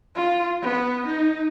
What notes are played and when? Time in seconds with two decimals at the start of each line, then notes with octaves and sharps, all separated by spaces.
0.15 F4
0.62 B3
1.06 D#4